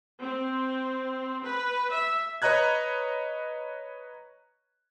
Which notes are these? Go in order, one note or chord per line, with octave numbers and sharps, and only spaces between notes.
C4
B4
E5
B4 C#5 D#5 A#5 F#6 G#6